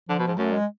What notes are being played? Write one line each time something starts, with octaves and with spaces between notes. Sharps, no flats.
D3 F3
B2
G#2
F#2 A3
G#3